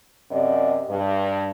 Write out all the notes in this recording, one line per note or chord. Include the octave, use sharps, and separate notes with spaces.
F#2 C3 D5 D#5
G2